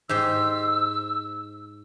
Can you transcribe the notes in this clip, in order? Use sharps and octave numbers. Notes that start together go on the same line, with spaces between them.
G#2 G4 C5 E6